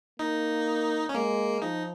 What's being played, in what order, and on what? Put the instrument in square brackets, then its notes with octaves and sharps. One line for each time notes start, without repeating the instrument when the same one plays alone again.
[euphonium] A#3 [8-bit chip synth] D#4
[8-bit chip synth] C#4
[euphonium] G#3 [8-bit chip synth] A#3
[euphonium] F3 [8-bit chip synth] D#4